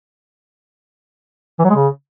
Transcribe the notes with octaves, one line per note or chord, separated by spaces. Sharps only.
E3
F#3
G#3
C#3